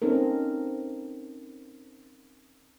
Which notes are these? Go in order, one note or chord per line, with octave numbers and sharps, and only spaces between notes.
C4 C#4 D#4 A4 A#4